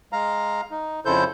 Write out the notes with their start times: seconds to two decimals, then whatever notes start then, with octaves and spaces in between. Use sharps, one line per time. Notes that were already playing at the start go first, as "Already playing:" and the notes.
0.13 G#3 F5 A#5
0.71 D#4
1.05 F2 C#3 E4 A4 C5 G6